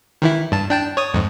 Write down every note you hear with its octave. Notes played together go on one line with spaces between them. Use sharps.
D#3 E3 E4
G2 A5
D4 G5 A5
C#5 D#6
F2 G#2